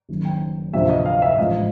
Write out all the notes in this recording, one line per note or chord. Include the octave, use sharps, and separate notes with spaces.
F#1 F#2 D#3
G5
D2 C3 F3 E5
D#5
F5
E5
A1 G#2 F3 D#5